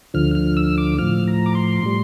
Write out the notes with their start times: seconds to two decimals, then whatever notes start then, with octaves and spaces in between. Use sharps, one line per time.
0.14 D2 D3 F3 F6
0.35 F6
0.57 E6
0.78 D6
0.98 A2 F3 F6
1.28 A#5
1.46 D6
1.55 C6
1.84 A2 G3